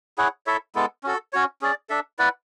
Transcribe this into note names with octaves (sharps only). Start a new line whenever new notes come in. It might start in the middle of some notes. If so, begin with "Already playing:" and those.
E4 G#4 C#5 F#5
E4 A4 C#5 E5
G#3 B3 E4 A4
C#4 F#4 A4
C#4 F#4 C#5
C#4 G#4 D5
D4 A4 E5
E4 B4 D5 F#5